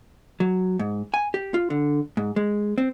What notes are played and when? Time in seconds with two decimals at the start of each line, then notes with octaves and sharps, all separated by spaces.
0.40 F#3
0.79 G#2
1.14 G#5
1.34 G4
1.54 F4
1.70 D3
2.17 G#2
2.36 G#3
2.78 C4